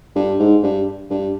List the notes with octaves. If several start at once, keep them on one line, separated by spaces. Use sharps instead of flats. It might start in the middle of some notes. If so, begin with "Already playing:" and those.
G2
G#2
G2
G2